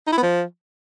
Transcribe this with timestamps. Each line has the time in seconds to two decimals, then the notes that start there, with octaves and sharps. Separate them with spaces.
0.07 D#4
0.12 E4
0.18 B3
0.23 F3